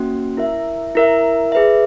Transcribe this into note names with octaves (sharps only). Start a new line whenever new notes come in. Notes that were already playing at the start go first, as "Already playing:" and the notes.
Already playing: A#3 C#4 F#4
E4 A#4 E5
E4 A#4 E5
G#4 B4 E5